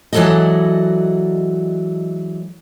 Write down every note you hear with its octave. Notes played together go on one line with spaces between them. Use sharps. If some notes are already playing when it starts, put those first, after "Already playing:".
E3 F#3 G#3 A4 D5 D#5